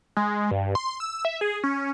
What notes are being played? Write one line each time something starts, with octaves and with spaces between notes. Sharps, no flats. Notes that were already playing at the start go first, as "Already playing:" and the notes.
G#3
G2
C6
E6
E5
G#4
C#4